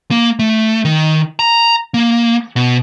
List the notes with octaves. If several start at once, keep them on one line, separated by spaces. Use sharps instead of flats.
A#3
A3
D#3
A#5
A#3
B2